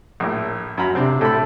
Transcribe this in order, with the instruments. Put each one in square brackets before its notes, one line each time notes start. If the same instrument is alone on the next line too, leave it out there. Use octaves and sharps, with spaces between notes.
[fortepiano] A#1 A2
F#2 A#5 B5
[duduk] C3 [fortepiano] C4 D4
[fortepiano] A2 B5 [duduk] A4